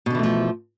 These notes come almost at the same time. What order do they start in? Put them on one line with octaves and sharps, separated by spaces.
B2 D3 E3 A3 F3